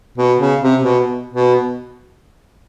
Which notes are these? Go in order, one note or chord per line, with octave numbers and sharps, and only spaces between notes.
B2
C#3
C3
B2
B2